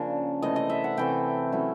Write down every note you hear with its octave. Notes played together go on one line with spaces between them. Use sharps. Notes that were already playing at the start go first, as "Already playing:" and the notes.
Already playing: C#3 F3 A#3 D4
C3 E3 A3 C4 D#5
D#5
E5
F#5
C3 E3 A3 C4 G5
F#3 A3 C#4 E4